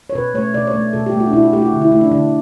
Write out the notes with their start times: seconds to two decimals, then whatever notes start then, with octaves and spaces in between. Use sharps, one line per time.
0.10 C#5
0.15 B2 B4
0.34 A3 C#5
0.54 B2 D5
0.67 C#5
0.74 A3
0.93 B2 A4
1.06 G4
1.13 A3
1.20 F#4
1.27 D4
1.33 B2 E4
1.42 F#4
1.53 A3 G4
1.62 F#4
1.72 D3
1.81 E4
1.92 A3 E4
2.01 D4
2.12 D3 D4